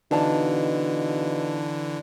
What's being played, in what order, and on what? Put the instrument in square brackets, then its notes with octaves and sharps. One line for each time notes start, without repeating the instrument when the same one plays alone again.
[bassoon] B2 [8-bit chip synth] D3 E3 [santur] D4 F5 A5 [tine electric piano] D#4